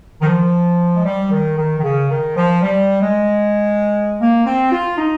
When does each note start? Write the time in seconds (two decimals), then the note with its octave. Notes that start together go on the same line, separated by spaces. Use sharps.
0.21 D#3
0.26 F3
0.95 G#3
1.05 G3
1.31 D#3
1.57 D#3
1.78 D#3
1.83 C#3
2.10 D#3
2.35 F3
2.62 G3
3.01 G#3
4.20 A#3
4.45 C4
4.72 F4
4.98 D#4